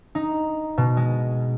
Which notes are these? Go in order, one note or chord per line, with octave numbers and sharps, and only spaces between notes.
D#4
B2
G#3